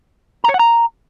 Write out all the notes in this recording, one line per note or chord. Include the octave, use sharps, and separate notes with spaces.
A#5
C#5
F#5
A#5